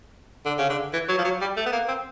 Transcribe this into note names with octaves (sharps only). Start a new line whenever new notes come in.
D3
C#3
D3
E3
F#3
F3
F#3
G3
A3
B3
A#3
C4